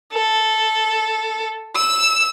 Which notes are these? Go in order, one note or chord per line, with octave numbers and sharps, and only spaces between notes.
A4
E6